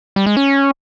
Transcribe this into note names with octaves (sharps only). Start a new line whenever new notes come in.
G3
G#3
C#4